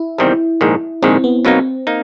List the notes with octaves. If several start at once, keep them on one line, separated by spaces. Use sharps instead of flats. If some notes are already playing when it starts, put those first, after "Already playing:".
Already playing: E4
E2 C3 D#3 G3 C4
A#1 G#2 D#3
A#1 G#2 D#3 C4
B3
B2 F#3 A#3 C4 D#4
A#3 D#4